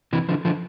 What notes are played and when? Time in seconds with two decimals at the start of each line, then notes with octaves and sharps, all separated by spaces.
0.13 C3 E3
0.29 D3 F3
0.45 D3 F3